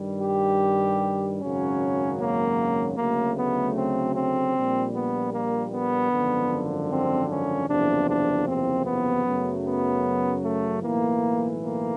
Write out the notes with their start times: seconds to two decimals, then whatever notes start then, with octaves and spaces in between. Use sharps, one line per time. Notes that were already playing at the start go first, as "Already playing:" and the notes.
Already playing: G2 D#3 G3
0.23 G4
1.41 G#1 F#2 C#3 F#3 C#4
2.20 A#3
2.97 D2 C#3 F#3 A3 A#3
3.37 B3
3.76 C4
4.15 C4
4.55 A#1 A#2 G3
4.94 B3
5.33 A#3
5.72 B3
6.12 G#1 F#2 D3 F3
6.91 C4
7.30 C#4
7.69 F#1 E2 C3 F3 D4
8.08 D4
8.47 C4
8.86 B3
9.25 F#2 C#3 F#3 A3
9.65 B3
10.43 A3
10.83 B1 A2 E3 A#3
11.61 A#3